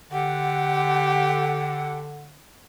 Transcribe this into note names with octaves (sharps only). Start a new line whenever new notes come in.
D3 G4 F#5